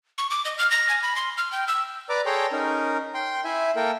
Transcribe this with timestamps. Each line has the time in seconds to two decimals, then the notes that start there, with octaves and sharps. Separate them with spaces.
0.18 C#6
0.31 D6
0.45 D#5
0.59 F6
0.71 A#6
0.89 G#5
1.03 B5
1.16 C6
1.37 F6
1.52 G5
1.68 E6
2.09 B4 D5 A#5 D6
2.26 G#4 A4 C#5 G5 A#5 C6
2.52 C#4 D#4 A#4
3.14 G5 C6
3.44 E4 E5 G#5
3.76 A#3 A4 A#4 G5